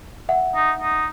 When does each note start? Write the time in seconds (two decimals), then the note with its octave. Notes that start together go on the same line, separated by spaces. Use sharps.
0.29 E5 F#5
0.55 D#4
0.81 D#4